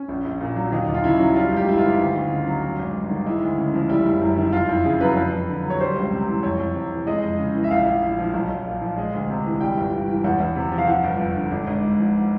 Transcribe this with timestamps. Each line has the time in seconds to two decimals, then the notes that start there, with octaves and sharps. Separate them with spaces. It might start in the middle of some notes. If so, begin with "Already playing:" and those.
Already playing: C#4
0.08 A#1
0.25 A#1
0.41 A#2
0.56 F#3
0.72 D#2 D#4
0.88 D#2
0.94 F4
1.04 C#3 E4
1.19 F#3
1.36 G3 F4
1.51 G#1
1.57 G4
1.68 G2 E4
1.78 F4
1.83 D#3
1.99 D2
2.15 D2
2.31 C#3
2.47 F#3
2.63 F#3
2.79 G#1
2.95 G2
3.11 D#3
3.26 G#3 E4
3.42 D2
3.58 C#3
3.74 F3
3.89 G3 E4
4.06 F#1
4.22 F#2
4.37 D#3
4.53 F2 F4
4.69 F2 E4
4.85 C#3 G#4
5.00 F#3 B4
5.17 F2 B4
5.33 F2
5.49 D3
5.64 F#3
5.70 C#5
5.80 G3 C5
5.96 C#2
6.12 C3
6.28 E3
6.43 F2 C#5
6.60 F2
6.75 C3
6.91 E3
7.07 G#3 D#5
7.23 F2
7.39 C#3
7.54 E3
7.64 E5
7.71 A#1 F5
7.86 A#1
8.03 A2
8.19 F3
8.34 B1
8.49 B1
8.66 A#2
8.81 F3
8.98 G#3
9.14 D2
9.30 C3
9.45 E3
9.61 G3 G5
9.77 G1
9.93 G2
10.08 E3
10.24 E2 F#5
10.40 E2
10.56 C3
10.72 F3
10.78 F5
10.88 F3 F#5
11.04 G1
11.20 F2
11.36 D3
11.51 G#1
11.67 G#1
11.83 G#2
12.00 F3